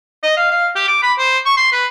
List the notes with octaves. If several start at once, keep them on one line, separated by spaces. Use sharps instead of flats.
D#5
F5
F5
G4
D6
B5
C5
C#6
C6
B4